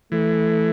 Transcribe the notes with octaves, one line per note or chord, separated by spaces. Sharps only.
E3 A3